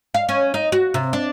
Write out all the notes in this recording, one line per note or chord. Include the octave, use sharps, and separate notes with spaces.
F5
C#4
D#4
F#4
C3
D4